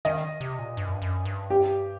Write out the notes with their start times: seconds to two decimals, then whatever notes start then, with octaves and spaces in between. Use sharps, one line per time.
0.05 D#3 D#5
0.41 C3
0.59 A#2
0.77 G2
0.85 F#2
0.93 G2
1.02 F#2
1.25 G2
1.50 G4